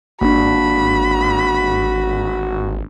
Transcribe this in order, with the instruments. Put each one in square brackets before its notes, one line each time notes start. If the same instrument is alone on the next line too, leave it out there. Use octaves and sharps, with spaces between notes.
[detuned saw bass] G#1 [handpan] A#3 D4 [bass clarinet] F#4 [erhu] B5